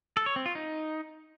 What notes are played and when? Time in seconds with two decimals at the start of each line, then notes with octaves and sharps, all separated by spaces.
0.17 A4
0.26 C#5
0.36 C4
0.46 F4
0.55 D#4